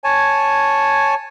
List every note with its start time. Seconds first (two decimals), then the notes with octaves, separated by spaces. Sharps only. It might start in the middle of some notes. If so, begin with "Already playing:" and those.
0.04 C#5 G#5 A5